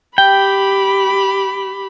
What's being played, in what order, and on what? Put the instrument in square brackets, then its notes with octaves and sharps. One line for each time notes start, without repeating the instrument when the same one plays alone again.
[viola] G4 B5 [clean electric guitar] G5